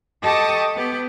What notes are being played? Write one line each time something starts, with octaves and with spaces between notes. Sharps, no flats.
G4 A4 D#5 A5 C#6 D#6
B3 G4